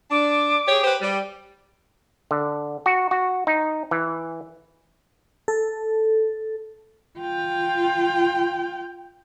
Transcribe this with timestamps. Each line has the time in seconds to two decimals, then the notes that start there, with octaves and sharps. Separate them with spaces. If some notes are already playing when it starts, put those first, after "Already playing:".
0.11 D4 D6
0.68 G4 G#4 C#5
0.84 G4 B4 C5
1.01 G3
2.31 D3
2.86 F#4
3.11 F#4
3.47 D#4
3.91 E3
5.48 A4
7.19 F4 G5